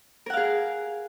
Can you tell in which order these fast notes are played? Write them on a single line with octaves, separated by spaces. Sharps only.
A#4 F#5 F5 G#4